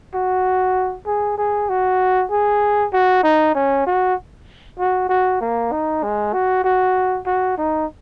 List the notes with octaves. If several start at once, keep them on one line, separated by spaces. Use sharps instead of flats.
F#4
G#4
G#4
F#4
G#4
F#4
D#4
C#4
F#4
F#4
F#4
A#3
D#4
G#3
F#4
F#4
F#4
D#4